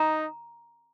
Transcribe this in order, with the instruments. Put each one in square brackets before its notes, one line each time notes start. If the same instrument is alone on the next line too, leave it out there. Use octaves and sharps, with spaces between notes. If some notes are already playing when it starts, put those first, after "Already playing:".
Already playing: [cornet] D#4 [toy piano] A#5